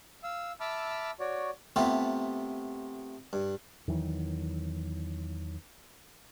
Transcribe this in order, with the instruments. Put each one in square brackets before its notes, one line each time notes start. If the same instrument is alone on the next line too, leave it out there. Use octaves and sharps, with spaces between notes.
[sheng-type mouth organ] F5 E6
E5 A5 B5 D6 E6 F6
F#4 C#5 D5
[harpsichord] C3 A3 B3 F4 G4 B4
G2
[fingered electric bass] E2 D#3 E3 F#3